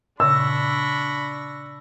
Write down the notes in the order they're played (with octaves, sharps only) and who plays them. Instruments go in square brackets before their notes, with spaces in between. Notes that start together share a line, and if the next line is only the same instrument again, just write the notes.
[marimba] A#2 C#3 [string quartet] D4 C#6 A#6 [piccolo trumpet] B5 [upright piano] E6